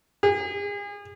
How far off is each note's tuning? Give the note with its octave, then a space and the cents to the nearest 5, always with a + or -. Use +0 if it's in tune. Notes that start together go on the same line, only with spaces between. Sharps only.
G#4 -35